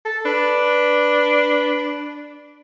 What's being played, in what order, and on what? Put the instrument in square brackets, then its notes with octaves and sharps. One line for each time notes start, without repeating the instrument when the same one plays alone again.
[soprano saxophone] A4
[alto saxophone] D4 [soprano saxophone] B4